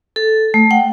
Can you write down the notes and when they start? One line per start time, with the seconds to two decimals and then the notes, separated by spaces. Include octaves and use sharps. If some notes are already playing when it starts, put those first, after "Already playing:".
0.16 A4
0.54 A3
0.71 F#5 G5